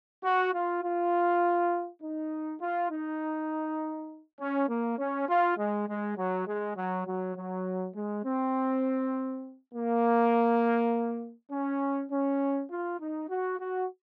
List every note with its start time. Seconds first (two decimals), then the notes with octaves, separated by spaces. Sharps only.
0.24 F#4
0.53 F4
0.83 F4
2.02 D#4
2.61 F4
2.91 D#4
4.39 C#4
4.69 A#3
4.99 C#4
5.28 F4
5.58 G#3
5.88 G#3
6.17 F#3
6.47 G#3
6.76 F#3
7.06 F#3
7.36 F#3
7.95 G#3
8.25 C4
9.73 A#3
11.51 C#4
12.11 C#4
12.71 F4
13.00 D#4
13.29 F#4
13.59 F#4